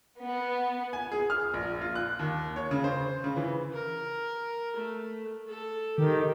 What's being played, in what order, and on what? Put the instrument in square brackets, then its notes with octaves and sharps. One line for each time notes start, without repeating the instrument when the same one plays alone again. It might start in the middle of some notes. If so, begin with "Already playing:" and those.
[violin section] B3
[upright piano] G#5
G#4
F6
A#1
F4
F#6
D#2
C#5
C#3
C5
C#3
E3
[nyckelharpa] A#4
A3
A4
[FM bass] D#3 [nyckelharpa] G4